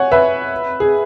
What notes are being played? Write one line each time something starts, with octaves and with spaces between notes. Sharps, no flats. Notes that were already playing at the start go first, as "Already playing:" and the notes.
Already playing: C#5 F#5 G#5
B4 E5
G#4